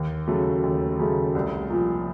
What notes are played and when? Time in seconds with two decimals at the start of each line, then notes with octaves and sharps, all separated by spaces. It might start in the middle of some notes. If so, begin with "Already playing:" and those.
Already playing: D#2
0.27 C#3 F#3 A3
0.63 D#2
0.99 C#3 F#3 A3
1.35 C2
1.70 A#2 F3